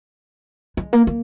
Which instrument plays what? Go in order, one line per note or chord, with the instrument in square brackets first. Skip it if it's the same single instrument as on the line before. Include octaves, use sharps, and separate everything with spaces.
[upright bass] G#3
A#3
A#3